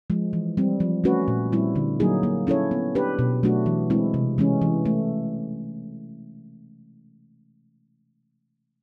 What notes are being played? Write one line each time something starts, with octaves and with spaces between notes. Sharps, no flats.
F3 G#3
E3
G3 C4
F3
A3 C#4 F#4 B4
A#2
G3 C4 E4
D3
F#3 A#3 D#4 G#4
A#3
C#4 E4 A4 C#5
B3
D4 G4 B4
B2
F#3 A3 D4 F#4
E3
G#3 C4 E4
C3
E3 G#3 C#4
E3
A3